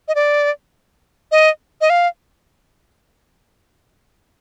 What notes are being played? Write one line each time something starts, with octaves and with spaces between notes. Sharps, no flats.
D#5
D5
D#5
D#5
F5